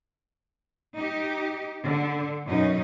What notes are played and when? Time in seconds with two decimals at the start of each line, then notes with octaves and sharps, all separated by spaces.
0.95 D#4 G4
1.83 D3
2.46 F#2 B2 C#4 D#4